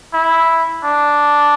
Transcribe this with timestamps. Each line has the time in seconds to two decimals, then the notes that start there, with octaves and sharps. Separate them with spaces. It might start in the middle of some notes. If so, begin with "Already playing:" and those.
0.14 E4
0.84 D4